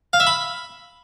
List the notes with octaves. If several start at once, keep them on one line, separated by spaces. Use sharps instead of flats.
F5
E5
B5